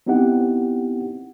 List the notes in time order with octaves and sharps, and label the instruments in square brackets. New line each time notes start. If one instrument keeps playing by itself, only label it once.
[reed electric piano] B3 C4 D#4 E4 G4 F#5